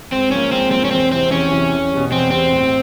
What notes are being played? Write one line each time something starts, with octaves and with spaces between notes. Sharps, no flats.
G#2 C4
F3 A#3 C#4
G#2 C4
F3 A#3 C4
C#4
E2 C4
C3 E3 C4
E2 C#4
C3 E3
E2
B2 G3
E2 C4
B2 G3 C4
A2